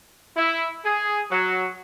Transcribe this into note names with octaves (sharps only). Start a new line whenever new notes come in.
E4
G#4
F#3